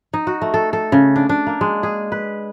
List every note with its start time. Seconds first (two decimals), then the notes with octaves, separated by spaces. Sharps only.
0.13 D#4
0.27 F#4
0.42 A3
0.54 A4
0.73 A4
0.92 C#3
1.16 D4
1.29 D4
1.47 A#3
1.61 G#3
1.83 G#4
2.12 B4